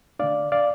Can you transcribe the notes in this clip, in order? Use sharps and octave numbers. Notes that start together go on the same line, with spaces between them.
D3 A3 D4 D5 F5
D5 F5